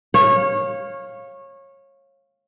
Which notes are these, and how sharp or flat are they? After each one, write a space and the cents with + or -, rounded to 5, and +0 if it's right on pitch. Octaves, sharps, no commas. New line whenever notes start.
C#5 -20 F5 +0